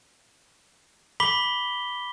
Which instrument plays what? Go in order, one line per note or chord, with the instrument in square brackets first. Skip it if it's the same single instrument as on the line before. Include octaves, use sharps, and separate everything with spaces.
[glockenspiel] B5 D6 B6 G7